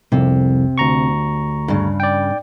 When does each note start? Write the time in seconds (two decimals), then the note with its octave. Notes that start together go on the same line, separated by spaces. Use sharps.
0.12 C2 F2 C3
0.78 D2 A#5 C#6
1.68 G2 C#3
2.00 D5 G5